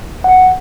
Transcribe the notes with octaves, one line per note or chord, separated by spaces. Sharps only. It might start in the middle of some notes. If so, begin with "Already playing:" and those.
F#5